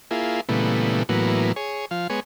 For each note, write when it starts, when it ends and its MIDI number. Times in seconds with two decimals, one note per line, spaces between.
0.11 0.41 58
0.11 0.41 64
0.11 0.41 65
0.11 0.41 68
0.49 1.03 46
0.49 1.03 49
0.49 1.03 52
0.49 1.03 55
0.49 1.03 57
0.49 1.03 59
1.09 1.52 45
1.09 1.52 52
1.09 1.52 54
1.09 1.52 58
1.09 1.52 59
1.56 1.85 68
1.56 1.85 73
1.91 2.07 53
1.91 2.07 77
2.10 2.20 56
2.10 2.20 59
2.10 2.20 73
2.10 2.20 80